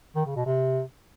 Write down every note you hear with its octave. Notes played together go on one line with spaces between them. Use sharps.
D#3
C#3
B2
C3